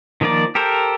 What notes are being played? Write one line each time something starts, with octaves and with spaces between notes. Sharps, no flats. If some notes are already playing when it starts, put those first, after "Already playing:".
D#3 F3 A#3 A#4 D5
G4 A4 A#4 C5